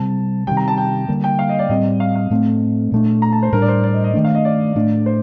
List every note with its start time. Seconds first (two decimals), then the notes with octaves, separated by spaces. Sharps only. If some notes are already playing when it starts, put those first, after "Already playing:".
Already playing: C3 G3 C4 A5
0.47 C3 D#3 G3 G5
0.57 A#5
0.68 A5
0.77 G5
1.08 D3 G3 A#3
1.24 G5
1.39 F5
1.49 D#5
1.59 D5
1.69 A2 G3 C4 D#5
2.00 F5
2.15 F5
2.30 A2 A3 C4
2.92 A#2 A3 D4
3.22 A#5
3.32 A5
3.42 C5
3.52 A2 G3 D4 A#4
3.62 D5
3.68 C5
3.84 D5
3.94 D#5
4.04 D#5
4.14 D#3 A3 D4
4.24 F5
4.35 D#5
4.45 D5
4.76 A2 A3 D4
5.06 C5